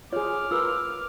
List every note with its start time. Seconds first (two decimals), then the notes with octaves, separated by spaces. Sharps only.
0.13 F4 G#4 C#5 D6 F6
0.51 F4 A#4 B4 E6